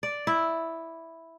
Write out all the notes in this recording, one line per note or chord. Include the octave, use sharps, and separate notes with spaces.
D5
E4